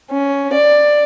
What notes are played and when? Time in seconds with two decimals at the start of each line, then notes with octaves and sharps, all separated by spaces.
0.11 C#4
0.54 D5